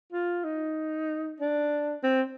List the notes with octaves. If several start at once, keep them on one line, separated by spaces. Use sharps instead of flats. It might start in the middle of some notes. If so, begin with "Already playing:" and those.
F4
D#4
D4
C4